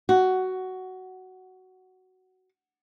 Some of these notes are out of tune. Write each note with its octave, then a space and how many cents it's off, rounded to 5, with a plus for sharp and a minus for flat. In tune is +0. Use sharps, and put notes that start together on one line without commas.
F#4 +10